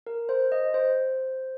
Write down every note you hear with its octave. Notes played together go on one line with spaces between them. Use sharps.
A#4
C5
D#5
C5